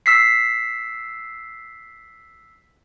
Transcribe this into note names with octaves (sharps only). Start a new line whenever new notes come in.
E6 B6 C7